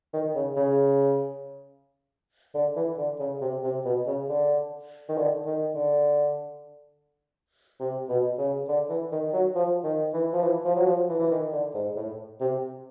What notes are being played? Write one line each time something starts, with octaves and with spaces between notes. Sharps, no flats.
D#3
C#3
C#3
D3
E3
D3
C#3
C3
C3
B2
C#3
D3
D#3
D3
D#3
D3
C3
B2
C#3
D3
E3
D#3
F#3
F3
D#3
E3
F3
E3
F3
F#3
F3
E3
E3
D#3
D3
G#2
A2
C3